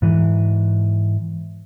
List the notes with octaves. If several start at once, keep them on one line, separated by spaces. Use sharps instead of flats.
G#2 E3